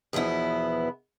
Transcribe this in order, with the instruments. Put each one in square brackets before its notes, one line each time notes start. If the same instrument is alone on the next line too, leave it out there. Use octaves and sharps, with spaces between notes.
[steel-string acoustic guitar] E2 B2 F3 B3 E4